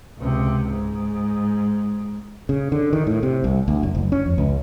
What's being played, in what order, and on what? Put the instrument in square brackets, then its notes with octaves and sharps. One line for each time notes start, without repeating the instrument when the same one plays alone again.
[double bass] C#2 C3
G#2
[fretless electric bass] C#3
D3
D#3
A2
C3
C2
D2
F#1
F#1
C#4
F2
C#2